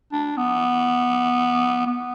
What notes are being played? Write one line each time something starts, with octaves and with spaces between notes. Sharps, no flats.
D4
B3
B3